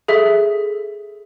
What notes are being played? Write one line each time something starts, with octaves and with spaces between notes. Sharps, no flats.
G#4 A4 E5